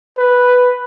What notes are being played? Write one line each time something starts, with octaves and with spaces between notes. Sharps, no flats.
B4